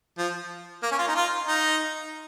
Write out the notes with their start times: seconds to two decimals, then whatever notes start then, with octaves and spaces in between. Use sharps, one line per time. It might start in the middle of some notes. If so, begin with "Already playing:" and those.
0.18 F3
0.83 A#3
0.92 C#4
0.98 F4
1.08 D#4
1.16 F4
1.47 D#4